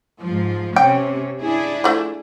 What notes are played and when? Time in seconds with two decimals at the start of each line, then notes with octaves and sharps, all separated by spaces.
0.22 G#2 F3
0.76 C3 C#4 G5
1.41 D4 E4 G#4
1.84 F3 A3